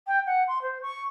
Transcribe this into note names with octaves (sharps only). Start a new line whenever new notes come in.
G5
F#5
C6
C5
C#6